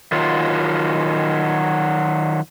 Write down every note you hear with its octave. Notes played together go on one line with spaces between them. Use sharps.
D#3 F#3 F4